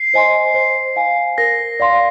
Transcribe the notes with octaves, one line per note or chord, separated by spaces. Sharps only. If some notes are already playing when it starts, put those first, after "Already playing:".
Already playing: C7
C5 D#5 G#5 C6
C5
F5 G#5
A#4 A#6
D5 F5 C6